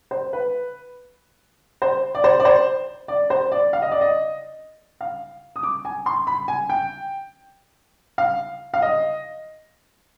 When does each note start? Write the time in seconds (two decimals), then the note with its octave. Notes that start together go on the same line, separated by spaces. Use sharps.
0.11 C5
0.33 B4
1.82 C5
2.15 D5
2.24 C5
2.40 D5
2.45 C5
3.08 D5
3.30 C5
3.52 D5
3.73 F5
3.82 D#5
3.92 D5
4.01 D#5
5.01 F5
5.56 D#6
5.63 D6
5.85 G#5
6.06 C6
6.27 B5
6.48 G#5
6.69 G5
8.18 F5
8.74 F5
8.82 D#5